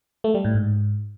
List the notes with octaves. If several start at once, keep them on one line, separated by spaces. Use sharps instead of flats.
A3
G3
A2
G#2